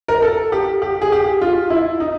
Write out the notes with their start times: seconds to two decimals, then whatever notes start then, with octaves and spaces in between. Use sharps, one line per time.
0.08 A#4
0.22 A4
0.52 G4
0.82 G4
1.02 G#4
1.12 G4
1.41 F4
1.70 E4
2.00 D#4